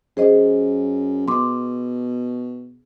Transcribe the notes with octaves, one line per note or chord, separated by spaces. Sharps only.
F#2 G#4 C5 D#5
B2 C6 D6